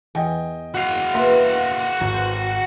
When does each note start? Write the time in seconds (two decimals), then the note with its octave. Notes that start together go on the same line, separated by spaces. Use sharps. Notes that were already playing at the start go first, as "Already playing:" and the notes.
0.15 E2 D#5 G5 G#5
0.75 F#4 F5
1.14 A#3 A#4 B4 E5 C6
2.01 G#1
2.14 C5